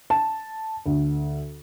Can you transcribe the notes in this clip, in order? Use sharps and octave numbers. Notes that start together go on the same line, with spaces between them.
A5
D2